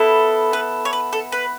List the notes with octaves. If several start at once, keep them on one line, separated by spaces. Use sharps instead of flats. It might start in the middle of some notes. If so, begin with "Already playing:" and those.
Already playing: B3 E4 A4
B4
C#5
B4
A4
B4